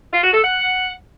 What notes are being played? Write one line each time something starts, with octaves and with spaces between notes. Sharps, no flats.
F4
F#4
A4
F#5